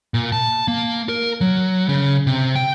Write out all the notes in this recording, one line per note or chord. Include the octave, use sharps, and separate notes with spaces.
A#2
A5
A#3
A#4
F#3
C#3
C3
G5